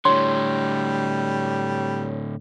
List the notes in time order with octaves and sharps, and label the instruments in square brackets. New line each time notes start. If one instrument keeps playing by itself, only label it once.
[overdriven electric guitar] A2 D3 [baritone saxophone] G3 [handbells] C#5 [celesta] C6